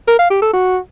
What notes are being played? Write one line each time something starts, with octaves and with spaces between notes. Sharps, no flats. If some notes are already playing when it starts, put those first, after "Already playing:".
A#4
F5
G4
A4
F#4